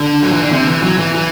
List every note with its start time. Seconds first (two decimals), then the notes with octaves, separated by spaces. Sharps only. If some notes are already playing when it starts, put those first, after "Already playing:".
Already playing: D3
0.23 F#3
0.32 E3
0.42 D3
0.52 C3
0.67 E3
0.83 F#3
0.99 E3
1.14 E3